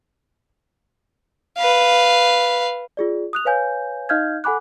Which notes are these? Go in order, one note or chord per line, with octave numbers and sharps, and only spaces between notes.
B4 F5
F4 G#4 D5
D#6 F#6 F7
B4 C#5 F5 G#5 G6
D#4 D#5 F5 F6 G6 G#6
A4 F#5 G#5 B5 D6 F#6